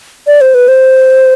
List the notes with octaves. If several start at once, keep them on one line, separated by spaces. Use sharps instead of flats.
D5
C5
B4
C5